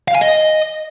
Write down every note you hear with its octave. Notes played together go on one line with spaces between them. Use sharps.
F5
G#5
D#5